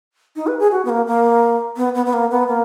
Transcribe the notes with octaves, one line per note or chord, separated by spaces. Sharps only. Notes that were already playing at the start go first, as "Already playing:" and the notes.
D#4
B4
G#4
F#4
B3
A#3
A#3
B3
B3
B3
A#3
B3
A#3